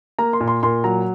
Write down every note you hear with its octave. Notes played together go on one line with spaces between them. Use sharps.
A#3 A#5
C6
A#2
C6
A#2 C6
F#3 A#5